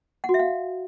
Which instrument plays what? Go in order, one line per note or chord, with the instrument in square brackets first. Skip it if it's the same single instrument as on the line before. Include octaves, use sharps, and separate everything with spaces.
[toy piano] F#5
F#4
E5
F5